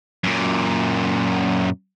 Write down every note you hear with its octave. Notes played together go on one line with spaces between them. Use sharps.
F#2 A#2